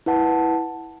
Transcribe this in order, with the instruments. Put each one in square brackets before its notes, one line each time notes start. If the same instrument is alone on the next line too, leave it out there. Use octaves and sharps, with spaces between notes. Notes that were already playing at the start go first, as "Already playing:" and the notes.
[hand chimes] E4 B4 F#5 A5